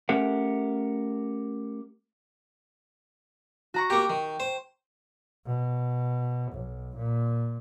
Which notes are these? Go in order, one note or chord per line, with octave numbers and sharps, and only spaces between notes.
A3 C#4 G4 A#4 F#5
F#4 A#5 C#6
A#3 G4 G5 C#6
D#3
C5
B2
B1
A#2